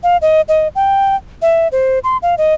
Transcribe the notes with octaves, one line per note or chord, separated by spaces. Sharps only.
F5
D#5
D#5
G5
E5
C5
C6
F5
D#5